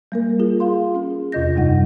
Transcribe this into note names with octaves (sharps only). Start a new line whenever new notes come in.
G3 A#3 A#4
F4 G#4
F4 G#4 F5 C6
C#4 G#4
E2 C3 F4 D#5 G6 A#6
F#2 G3 D#4 F#5